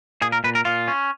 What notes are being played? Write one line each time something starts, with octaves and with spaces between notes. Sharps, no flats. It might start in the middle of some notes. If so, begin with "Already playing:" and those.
A#2 G#4
A#4
A#2 B4
A#4
A#2 F4
C#4